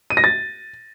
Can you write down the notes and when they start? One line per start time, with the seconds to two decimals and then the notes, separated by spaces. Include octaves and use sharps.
0.10 D#7
0.17 A#6
0.24 A6